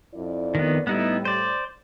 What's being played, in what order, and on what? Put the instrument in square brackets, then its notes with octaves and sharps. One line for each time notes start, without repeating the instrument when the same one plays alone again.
[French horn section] F2 E4 D5
[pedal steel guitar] D#3 B3
[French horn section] A2 G3 [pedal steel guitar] B3 D#4 E4
[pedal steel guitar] C5 D5